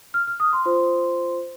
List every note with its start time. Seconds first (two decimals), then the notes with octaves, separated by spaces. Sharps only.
0.14 F6
0.27 F6
0.40 D#6
0.53 C6
0.65 F4 C5